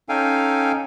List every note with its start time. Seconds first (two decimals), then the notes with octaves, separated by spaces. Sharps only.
0.09 C#4 D#4 A4 F5 G5 G#5